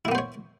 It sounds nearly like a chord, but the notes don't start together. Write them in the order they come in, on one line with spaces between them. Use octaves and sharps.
E4 A#3 B3 C5 C#5